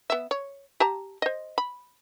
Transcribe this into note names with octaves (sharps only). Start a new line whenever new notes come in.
B3 E5
C#5
G4 A5 A#5
C5 D#5
B5